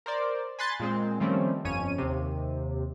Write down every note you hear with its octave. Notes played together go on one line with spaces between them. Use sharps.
A#4 C5 D5
G#5 B5 C6 F#6 A6
A#2 G#3 C4
D#3 F3 G3 A3 C4 C#4
G1 F2 C#4 C#5 D#7
D#2 C3